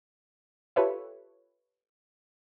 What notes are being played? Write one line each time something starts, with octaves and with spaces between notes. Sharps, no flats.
F4 G4 A4 B4 C#5 E5